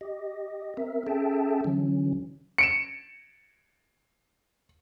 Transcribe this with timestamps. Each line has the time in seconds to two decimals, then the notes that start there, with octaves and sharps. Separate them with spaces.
0.01 G4 D#5
0.77 C4 A#4 E5
1.07 C#4 G#4 A4 E5 G5 A5
1.64 D3 E3 F#3 C#4
2.58 C#7 D7 E7